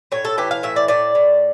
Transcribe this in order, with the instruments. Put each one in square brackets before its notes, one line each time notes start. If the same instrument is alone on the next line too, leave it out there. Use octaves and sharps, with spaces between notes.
[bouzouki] A2 C#5
A4
E3 G4
F5
A2 E5
D5
A2 D5
A2